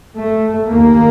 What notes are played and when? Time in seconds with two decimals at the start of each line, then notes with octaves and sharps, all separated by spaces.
0.18 A3
0.70 D#2 A#3